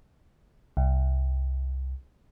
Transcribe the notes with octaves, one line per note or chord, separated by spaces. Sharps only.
C2